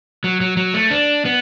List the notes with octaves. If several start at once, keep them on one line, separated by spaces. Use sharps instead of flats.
F#3
F#3
F#3
A3
D4
B3